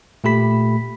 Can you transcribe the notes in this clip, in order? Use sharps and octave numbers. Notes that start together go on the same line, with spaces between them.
A#2 A3 G4 B5 B6